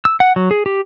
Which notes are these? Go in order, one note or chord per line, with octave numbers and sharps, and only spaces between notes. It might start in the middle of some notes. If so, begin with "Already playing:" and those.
E6
F#5
F#3
G#4
G4